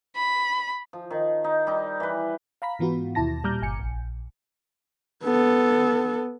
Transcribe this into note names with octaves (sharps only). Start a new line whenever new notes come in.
B5
F3
D#3
D#4
G3 D#4
E3 B4
F5 A#5 B5 B6
G#2 E3 B3 F4 F#4
D#2 B2 E4 A5 A#6
A#2 G3 A#5 D6 F6 G6
G1 G#5 C#7
A#1
B3 A4